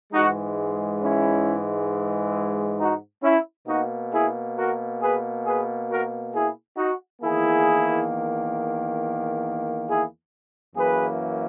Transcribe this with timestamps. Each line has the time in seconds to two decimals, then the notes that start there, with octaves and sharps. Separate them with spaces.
0.13 G#2 E3 G#3 D#4 F#4
1.01 C#4 E4
2.78 D#4 F#4
3.23 C#4 E4
3.67 B2 A#3 D#4 F#4
4.11 E4 G#4
4.56 F#4 A#4
5.00 G#4 B4
5.45 G#4 B4
5.89 F#4 A#4
6.33 E4 G#4
6.77 D#4 F#4
7.22 E2 D#3 A#3 E4 G#4
9.88 E4 G#4
10.76 F#2 E3 A#3 G#4 B4